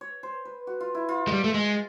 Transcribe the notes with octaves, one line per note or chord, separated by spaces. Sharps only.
C#5
C5
B4
F#4
F4
E4
F4
G#3
G3
A3
G#3